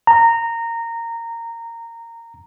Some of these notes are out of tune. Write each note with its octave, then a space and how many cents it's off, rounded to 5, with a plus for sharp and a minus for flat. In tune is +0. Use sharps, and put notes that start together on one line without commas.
A#5 -15